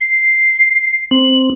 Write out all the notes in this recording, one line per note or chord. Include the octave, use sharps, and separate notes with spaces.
C7
C4 F#7